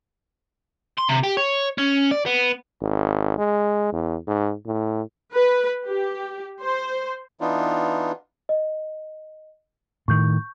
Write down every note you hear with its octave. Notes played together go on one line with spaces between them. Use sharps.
C6
C3
G4
C#5
C#4
D5
B3
G#1
G#3
E2
G#2
A2
B4
G4
C5
E3 B3 D4 D#4 F4
D#5
A2 D#3 C#6 G6